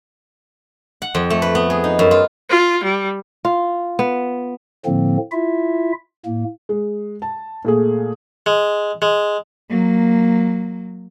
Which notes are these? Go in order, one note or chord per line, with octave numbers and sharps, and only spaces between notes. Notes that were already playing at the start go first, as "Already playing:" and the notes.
F#5
F2
A3
B4
B3
G#4
D#4
F#2
F4
F4
G3
F4
B3
A2 D3 F3 A#3 C4
E4 F4 E5
A2 A#3
G#3
A5
A#2 A3 G#4
G#3
G#3
F#3 A#3